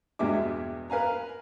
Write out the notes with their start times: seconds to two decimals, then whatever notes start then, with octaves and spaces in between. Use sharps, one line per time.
0.19 E2 G2 B2 G#3 E5 D6
0.90 A#4 B4 F5 G#5 A#5